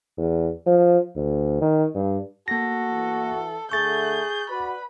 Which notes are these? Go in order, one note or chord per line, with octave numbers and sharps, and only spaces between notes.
E2
F3
D2
D#3
G2
A#3 F#4 A4 A#6
E3
D3 A3 G#4 C#6 G6 A6
F#4 B4 D5 B5